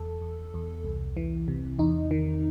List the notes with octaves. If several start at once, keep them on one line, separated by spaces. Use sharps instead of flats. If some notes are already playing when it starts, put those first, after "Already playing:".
Already playing: E2 A4
E2
E2
C2
E3
C3
E2 D#4
D#3